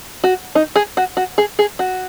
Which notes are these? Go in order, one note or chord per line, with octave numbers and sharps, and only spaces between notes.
F#4
D#4
G#4
F#4
F#4
G#4
G#4
F#4